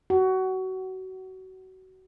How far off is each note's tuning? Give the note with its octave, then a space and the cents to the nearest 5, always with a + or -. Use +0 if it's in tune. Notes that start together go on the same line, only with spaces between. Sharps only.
F#4 +25